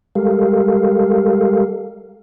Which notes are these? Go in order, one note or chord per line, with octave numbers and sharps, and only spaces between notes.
G3 G#3 G4 A4 A#4 F5